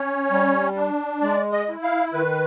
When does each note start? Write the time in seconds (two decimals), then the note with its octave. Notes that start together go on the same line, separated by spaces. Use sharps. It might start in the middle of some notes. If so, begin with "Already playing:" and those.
Already playing: C#4 C#5
0.31 G3
0.76 D4
1.22 G#3 D5
1.52 D#5
1.69 E4
1.83 F5
2.13 D#3 B4